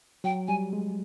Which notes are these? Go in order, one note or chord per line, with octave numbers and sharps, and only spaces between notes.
F#3 G5
G3 G#5
G#3